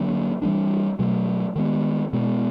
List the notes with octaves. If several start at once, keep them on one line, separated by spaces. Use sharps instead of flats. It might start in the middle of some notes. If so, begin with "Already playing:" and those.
Already playing: D3 F#3 A#3 D4
E3 G3 B3 D4
B2 F#3 A3
D#3 G#3 B3
B2 G#3 B3